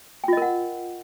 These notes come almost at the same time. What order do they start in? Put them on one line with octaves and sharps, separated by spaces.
G5 F4 D#5 A#4 F#5